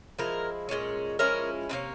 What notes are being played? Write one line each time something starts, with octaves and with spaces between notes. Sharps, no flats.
F3 G#3 E4 A#4
A#2 G#3 C#4
F3 G#3 C#4 E4 A#4
C3 F3 A#3 C#4